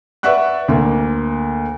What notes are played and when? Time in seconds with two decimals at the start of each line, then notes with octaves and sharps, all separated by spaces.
0.23 B4 D5 E5 F#5 C#6 F#6
0.68 D2 A#3